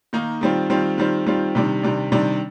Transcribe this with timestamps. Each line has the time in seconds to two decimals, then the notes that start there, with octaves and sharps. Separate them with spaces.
0.13 D#3 A#3 D#4
0.41 D#3 G3 C4 F4
0.70 D#3 G3 C4 F4
0.98 D#3 G3 C4 F4
1.26 D#3 G3 C4 F4
1.55 C3 D#3 G3 D4
1.83 C3 D#3 G3 D4
2.12 C3 D#3 G3 D4